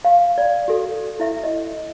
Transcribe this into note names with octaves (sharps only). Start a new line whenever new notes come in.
F5
D5
F#4 A4
E4 E5
D#5